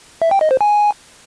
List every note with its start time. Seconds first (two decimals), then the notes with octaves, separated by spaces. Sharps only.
0.22 E5
0.31 G5
0.41 D#5
0.51 C5
0.61 G#5